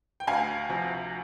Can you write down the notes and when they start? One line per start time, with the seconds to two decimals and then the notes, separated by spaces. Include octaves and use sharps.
0.20 G5
0.27 D2 F5 G#5
0.69 C3 F3